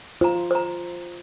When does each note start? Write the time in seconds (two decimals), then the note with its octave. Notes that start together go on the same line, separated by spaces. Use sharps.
0.21 F4 C5 A#5
0.51 C5 A#5